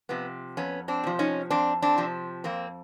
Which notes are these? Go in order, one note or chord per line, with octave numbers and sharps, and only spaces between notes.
C3 F3 B3
F2 B3 C#4
C4 D4
C3 F3
C#4 D#4
F2 C4 D4
C4 D4
C3 F3
F2 A#3 C4